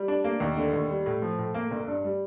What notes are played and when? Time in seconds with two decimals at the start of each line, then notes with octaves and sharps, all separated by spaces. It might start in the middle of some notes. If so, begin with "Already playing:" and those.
Already playing: G3
0.08 D4
0.24 A#3
0.40 D#2
0.57 D3
0.73 D#2
0.90 G3
1.06 A2
1.22 F3
1.38 A2
1.55 A#3
1.71 G1
1.88 G2
2.04 G3